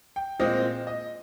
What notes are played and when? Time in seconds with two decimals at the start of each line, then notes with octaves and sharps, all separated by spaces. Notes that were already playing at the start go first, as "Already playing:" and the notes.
0.16 G5
0.39 A#2 G#3 C4 F4 D#5
0.87 D#5